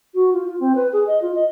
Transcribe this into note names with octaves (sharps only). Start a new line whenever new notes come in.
F#4
F4
F4
C4
B4
G#4
D#5
F4
D#5